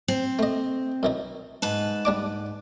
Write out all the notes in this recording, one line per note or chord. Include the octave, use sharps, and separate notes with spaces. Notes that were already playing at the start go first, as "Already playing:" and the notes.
C4
A3 D#5
F#2 E3 D#4
G#2 B4 A5
G3 D4 D6